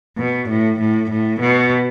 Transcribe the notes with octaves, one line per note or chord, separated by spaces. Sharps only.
B2
A2
A2
A2
B2